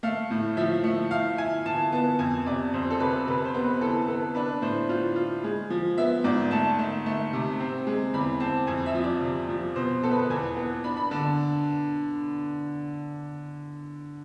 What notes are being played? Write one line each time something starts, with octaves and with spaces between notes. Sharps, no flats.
A3 F5
A2
F3 E5
A3
E4 F5
E4 G#5
E3 A5
B3 A5
F2 G#5
C3 D5
F2 C5
A4
C3 B4
C3 B4
C5
B3
B4
E3 A4
B3 A4
D4 B4
A2 C5
F4
F4
G#3
F3
B3 E5
G#2 D5
A3 A5
A3
A3
C3
C4
G#3
E2 B5
C4 A5
F2 G#5
E5
F3
D5
C3
F3
B2 C5
B3 A4
B4
A4
E2 G#5
B3
D4 B5
B5
D3 A5